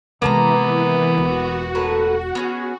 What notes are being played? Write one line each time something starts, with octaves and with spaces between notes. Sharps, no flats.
C3 E3 G#3 A#3 B3 A5 A#5
E1 F#4
A2 A#4 B4
B3 C#4 G#4